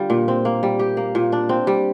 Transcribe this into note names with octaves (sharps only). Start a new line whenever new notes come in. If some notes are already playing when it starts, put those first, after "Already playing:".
Already playing: D3 G3 D4 F4
A#2
C4
A#3
G3
G4
A#3
A#2
D4
C4
G3